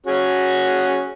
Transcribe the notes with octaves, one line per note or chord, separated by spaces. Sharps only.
C#4 F#4 G#4